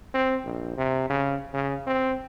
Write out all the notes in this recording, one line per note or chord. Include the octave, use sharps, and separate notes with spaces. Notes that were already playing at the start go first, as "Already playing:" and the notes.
C4
A#1
C3
C#3
C#3
C4